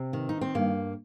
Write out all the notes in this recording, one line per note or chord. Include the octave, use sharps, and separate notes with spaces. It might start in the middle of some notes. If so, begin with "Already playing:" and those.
Already playing: C3 C4
D#3
D#4
C4
G2 A#3